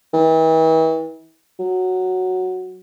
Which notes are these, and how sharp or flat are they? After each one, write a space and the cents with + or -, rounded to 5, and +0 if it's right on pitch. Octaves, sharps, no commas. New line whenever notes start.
E3 -40
F#3 -5